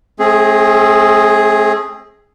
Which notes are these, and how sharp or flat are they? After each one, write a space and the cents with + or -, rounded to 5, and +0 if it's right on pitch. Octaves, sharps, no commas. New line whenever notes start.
A3 -40 C4 +30 G#4 +0